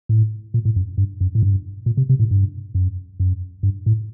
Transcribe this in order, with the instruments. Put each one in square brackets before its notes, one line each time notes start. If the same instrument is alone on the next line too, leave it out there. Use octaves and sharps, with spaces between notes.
[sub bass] A2
A#2
A2
F#2
G2
F#2
A2
G2
A#2
C3
C3
A2
G2
F#2
F#2
G2
A2